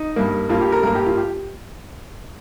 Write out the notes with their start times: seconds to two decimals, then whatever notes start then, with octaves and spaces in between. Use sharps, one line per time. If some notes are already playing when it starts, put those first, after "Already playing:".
Already playing: D#4
0.16 G2 G3 A#3
0.49 G2 G3 A#3 F4
0.61 G4
0.72 A#4
0.83 G2 G3 A#3 A#4
0.95 G4
1.06 F4
1.17 G4